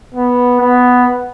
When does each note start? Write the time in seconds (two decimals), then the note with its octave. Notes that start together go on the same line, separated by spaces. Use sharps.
0.15 B3
0.61 B3